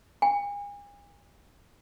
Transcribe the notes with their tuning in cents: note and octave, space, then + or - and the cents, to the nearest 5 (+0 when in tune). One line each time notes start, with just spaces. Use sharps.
G#5 -40